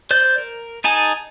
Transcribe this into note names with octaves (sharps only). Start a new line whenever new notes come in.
C5 D5 G6
A#4
D#4 G#4 G#5 A5